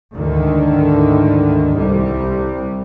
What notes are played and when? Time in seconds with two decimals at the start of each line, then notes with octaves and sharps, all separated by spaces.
0.15 D2 G#2 D3 D#3
1.76 C2 C3 G3